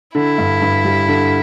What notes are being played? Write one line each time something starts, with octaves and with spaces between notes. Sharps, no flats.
D3 E4
G2
G2
G3
D3